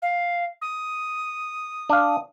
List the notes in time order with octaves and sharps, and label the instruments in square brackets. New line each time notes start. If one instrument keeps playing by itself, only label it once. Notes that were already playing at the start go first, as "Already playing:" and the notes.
[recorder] F5
D#6
[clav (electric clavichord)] D4 F5